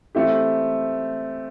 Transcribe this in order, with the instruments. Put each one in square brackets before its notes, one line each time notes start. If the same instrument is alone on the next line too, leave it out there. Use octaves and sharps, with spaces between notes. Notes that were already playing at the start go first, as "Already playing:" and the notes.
[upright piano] E3 A3 C4 E4 G4